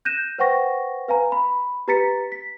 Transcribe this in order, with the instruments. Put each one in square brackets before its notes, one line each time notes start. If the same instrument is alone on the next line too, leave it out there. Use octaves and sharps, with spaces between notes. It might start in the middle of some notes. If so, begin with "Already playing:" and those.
[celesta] F#6 G6 A#6 D#7 E7
B4 C5 F#5 G5 C#6 A#6
B4 F5 G#5 A#5
B5
G4 B4 A#5 A6 B6 C#7
B6